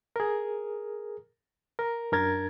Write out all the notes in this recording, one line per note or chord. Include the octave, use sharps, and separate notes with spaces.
G#4 A#4
A#4
F#2 D4 A#4 G#6 A6